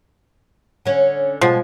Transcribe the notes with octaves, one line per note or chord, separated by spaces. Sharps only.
D3 C#4
B2 F3 G#3